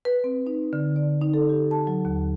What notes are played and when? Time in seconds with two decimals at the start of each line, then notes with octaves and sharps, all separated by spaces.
0.05 B4
0.24 C4
0.47 D#4
0.73 D3
0.96 D5
1.21 D#4
1.34 A4
1.49 G4
1.71 A5
1.87 F#3
2.05 D#2